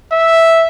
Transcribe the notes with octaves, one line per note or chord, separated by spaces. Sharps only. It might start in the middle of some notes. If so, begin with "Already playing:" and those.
E5